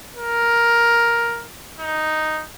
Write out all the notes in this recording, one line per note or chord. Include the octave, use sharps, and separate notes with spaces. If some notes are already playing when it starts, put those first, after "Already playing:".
A#4
D#4